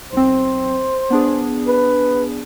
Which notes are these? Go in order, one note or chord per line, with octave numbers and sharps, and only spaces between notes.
B1 C4 C5
B3 D4 G#4
B4